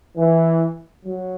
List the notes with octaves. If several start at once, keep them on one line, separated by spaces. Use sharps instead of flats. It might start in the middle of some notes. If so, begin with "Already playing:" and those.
E3
F#3